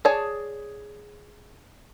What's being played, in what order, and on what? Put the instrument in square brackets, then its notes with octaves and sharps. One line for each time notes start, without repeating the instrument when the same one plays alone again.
[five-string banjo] G#4 C#5 D5 A5